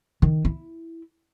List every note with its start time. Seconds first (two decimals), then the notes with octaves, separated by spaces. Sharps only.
0.22 D#3
0.45 E4